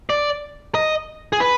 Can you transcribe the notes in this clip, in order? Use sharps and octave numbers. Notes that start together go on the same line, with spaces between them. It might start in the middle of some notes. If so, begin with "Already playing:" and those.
D5
D#5
G#4
B4